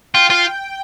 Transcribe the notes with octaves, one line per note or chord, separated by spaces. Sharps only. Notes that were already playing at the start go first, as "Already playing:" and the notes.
F4 G5
F4